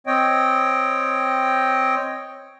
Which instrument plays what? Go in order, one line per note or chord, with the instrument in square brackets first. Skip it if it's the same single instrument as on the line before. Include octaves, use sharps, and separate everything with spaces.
[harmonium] C4 C#5 D#5 G5